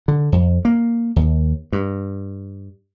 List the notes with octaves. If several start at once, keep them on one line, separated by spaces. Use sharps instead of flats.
D3
F2
A#3
D#2
G2